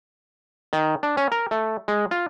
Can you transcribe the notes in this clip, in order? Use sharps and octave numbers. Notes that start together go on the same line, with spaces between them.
D#3
D4
C#4
A#4
A3
G#3
F4